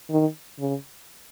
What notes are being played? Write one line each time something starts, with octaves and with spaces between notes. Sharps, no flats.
D#3
C#3